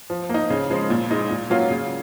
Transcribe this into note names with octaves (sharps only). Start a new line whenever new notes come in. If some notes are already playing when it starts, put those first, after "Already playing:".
F3
A#3 D#4
C#3
F3 G#3
A#2
G#3 D#4
A#2
F#3 A#3 C#4 F4
C#3